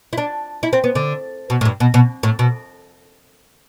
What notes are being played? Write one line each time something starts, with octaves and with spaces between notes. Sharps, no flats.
E4
D4
E4
C4
B3
D3
B2
A2
G2
B2
B2
A2
B2